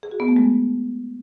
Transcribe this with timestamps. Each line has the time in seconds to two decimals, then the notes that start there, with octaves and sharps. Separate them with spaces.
0.03 G#4
0.11 F#4
0.20 B3
0.28 A3
0.36 G#3